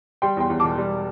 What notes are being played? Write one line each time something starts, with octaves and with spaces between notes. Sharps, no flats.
G3 G5 C6
E2 G5 C6
E2
E1 A5 D6
G3